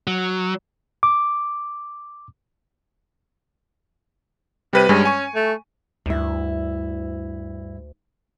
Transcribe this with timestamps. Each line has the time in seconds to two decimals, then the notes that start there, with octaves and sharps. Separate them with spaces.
0.07 F#3
1.03 D6
4.73 C3 G3 B4 D#7
4.89 G2 G3 G#3 C#4
5.05 G#5 C#6
5.35 A3
6.06 D2 G2 E4